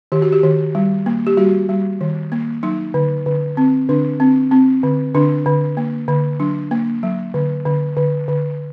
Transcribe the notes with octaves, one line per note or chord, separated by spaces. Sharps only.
D#3 G4
F#4
G4
D#3
G3
A#3
G4
G3 F#4
G3
D#3
A#3
F#3 D#4
D3
D3
C4
D3 D4
C4
C4
D3
D3 D4
D3
A#3
D3
F#3 D4
A#3
F#3
D3
D3
D3
D3